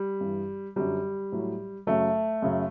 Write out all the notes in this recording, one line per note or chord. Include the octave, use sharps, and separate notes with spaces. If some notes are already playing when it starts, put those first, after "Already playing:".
Already playing: G3
G2 E3
F#2 D3 F#3 G3
A2 F#3
F#2 C#3 F#3 A3
F#2 C#3 F#3